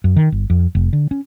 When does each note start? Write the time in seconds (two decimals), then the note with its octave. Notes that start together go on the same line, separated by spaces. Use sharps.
0.04 F#2
0.16 D#3
0.32 G1
0.50 F2
0.75 F1
0.93 D3
1.11 C#4